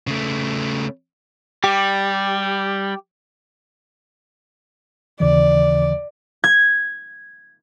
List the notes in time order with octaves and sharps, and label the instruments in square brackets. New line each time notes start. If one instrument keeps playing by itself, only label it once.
[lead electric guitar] C#3 A3
[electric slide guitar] G3 [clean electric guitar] G4
[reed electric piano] D#2 C#3 E3 [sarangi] D5
[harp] G#6